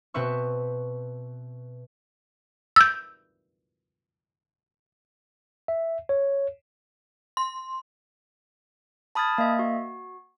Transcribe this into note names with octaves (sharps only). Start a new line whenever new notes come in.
B2 C4 B4 E5 C#6
E6 G6
E5
C#5
C6
A5 B5 D#6 F6 G#6 A6
A#3 D#5 E5
F#4